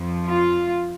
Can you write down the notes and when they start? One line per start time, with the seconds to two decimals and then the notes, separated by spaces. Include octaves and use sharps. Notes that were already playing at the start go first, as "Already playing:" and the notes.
Already playing: F2 F3
0.27 F4